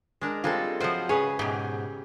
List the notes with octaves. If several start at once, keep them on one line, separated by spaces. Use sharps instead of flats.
G#3 D4 A#4
G3 G#3 C4 F4 A4
F3 F#3 F4 C5 F#5
C#3 G#4 B4 C#5
G#2 B2 G4